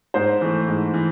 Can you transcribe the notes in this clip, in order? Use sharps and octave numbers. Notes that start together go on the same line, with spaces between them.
G#2 C5
E3 A3
G#2
E3